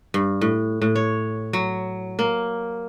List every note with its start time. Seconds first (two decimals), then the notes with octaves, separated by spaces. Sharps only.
0.14 G2
0.41 A2
0.82 A2
0.96 C#5
1.53 F#3
2.19 A#3